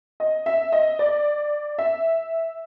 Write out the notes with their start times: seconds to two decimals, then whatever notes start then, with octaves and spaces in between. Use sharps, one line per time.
0.20 D#5
0.46 E5
0.72 D#5
0.99 D5
1.78 E5